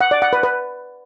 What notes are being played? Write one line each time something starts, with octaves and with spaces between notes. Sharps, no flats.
F#5
D5
F#5
B4
B4